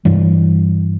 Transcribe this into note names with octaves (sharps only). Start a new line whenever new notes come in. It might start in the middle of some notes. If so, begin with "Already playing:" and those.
G2 E3 G3